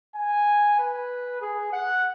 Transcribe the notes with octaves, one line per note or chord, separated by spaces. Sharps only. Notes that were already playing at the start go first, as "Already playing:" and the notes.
G#5
B4
G#4
F#5